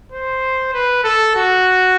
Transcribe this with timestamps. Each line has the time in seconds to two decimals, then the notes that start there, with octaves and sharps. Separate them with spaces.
0.12 C5
0.74 B4
1.04 A4
1.36 F#4